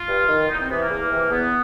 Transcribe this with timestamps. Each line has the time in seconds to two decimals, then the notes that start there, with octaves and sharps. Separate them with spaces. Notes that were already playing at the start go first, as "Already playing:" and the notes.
Already playing: F4
0.08 G2
0.28 D#3
0.49 E2 D#4
0.59 C4
0.69 C3 E3 B3
0.79 A#3
0.90 E2
1.10 C3 E3
1.31 E2 B3